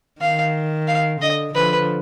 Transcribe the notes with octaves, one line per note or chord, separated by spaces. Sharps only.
D#3 F5
F5
D3 D#5
D3 F3 B4